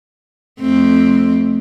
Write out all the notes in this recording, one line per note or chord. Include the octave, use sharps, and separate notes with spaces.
F2 A3 C4